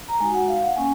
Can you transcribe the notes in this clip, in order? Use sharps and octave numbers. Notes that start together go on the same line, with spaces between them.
A#5
G#3 D#4 F#4 G#5
F#5
F5
F#5
A#3 C#4 G#5